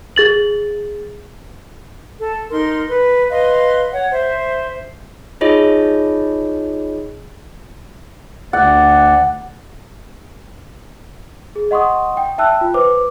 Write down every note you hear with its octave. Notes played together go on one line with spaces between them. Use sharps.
G#4 A6 F#7
A4
D#4 A#4 C6
B4
B4 D#5 F5 C6
C#5 F#5
C5 E5
D#4 F4 G#4 C#5 D#5
D2 D5 F#5
G#4
D#5 F#5 C6 C#6 D#6
G5
E5 G5 A5 E6 F#6
F4
B4 C5 D6